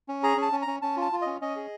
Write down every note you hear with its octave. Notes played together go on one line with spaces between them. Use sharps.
C#4
G#4 A#5
C#4
A5
C#4
A#5
C#4
C#4 A5
F4 A5
F4
C#4 D#5
C#4 D#5
G#4